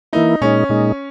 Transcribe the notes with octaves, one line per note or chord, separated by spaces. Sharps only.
E3 A#3 D#4 E4
A#2 G#3 C#4 D#4
A#2 G#3 D#4